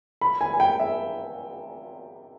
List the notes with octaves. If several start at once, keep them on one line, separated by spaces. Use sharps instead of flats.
B5
G#5
G#5
G5
E5